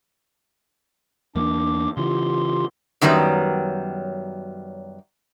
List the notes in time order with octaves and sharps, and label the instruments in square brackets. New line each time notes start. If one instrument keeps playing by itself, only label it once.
[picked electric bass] E2 A#3 [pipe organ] D4 D6
[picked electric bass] C#3 E3 [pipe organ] F4 G4 C6
[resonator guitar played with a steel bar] F#2 D#3 F#3 G3 B3